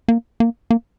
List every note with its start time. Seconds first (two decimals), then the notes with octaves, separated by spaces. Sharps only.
0.08 A#3
0.40 A#3
0.71 A#3